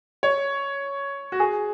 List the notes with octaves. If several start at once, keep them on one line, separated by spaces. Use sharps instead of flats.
C#5
F#4
G#4